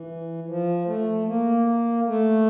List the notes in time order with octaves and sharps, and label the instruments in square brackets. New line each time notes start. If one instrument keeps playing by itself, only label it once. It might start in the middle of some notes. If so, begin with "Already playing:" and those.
Already playing: [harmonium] E3
F3
A3
A#3
A3